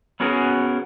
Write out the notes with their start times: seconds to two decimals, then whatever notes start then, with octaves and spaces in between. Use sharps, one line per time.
0.20 B3 C#4 F#4 G#4 A#4